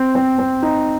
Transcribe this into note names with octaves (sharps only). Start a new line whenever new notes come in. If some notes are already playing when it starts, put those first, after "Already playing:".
Already playing: C4
C4
C4
D#4